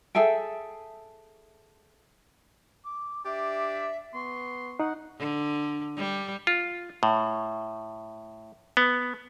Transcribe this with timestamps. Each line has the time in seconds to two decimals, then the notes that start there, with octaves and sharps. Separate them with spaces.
0.15 G#4 A4 E5 G5
2.84 D6
3.25 D4 G4 E5
4.14 B3 C6 C#6
4.80 D#4 F#5
5.19 D3
5.96 G3
6.47 F4
7.03 A2
8.77 B3